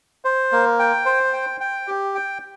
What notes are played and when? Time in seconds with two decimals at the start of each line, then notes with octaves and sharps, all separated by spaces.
0.25 C5
0.52 A#3
0.79 G5
1.06 C5
1.33 G5
1.61 G5
1.87 G4
2.15 G5